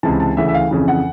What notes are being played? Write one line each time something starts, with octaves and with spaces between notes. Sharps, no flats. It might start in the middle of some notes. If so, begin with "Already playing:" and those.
C#2 C3 E3 A5
A5
D2 C#3 E3 E5
E5
F5
F2 C#3 E3
F#5